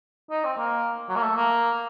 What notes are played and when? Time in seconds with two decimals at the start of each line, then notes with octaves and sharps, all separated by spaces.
0.30 D#4
0.44 C4
0.57 A#3
1.09 F#3
1.15 A#3
1.21 A3
1.35 A#3